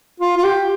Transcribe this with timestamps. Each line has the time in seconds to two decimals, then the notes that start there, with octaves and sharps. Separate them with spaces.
0.20 F4
0.37 F4
0.44 G4